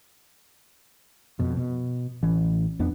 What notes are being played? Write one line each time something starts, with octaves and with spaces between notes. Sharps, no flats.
F2 B2
B2
A1 E3 C#4
E1 F2 B3 D4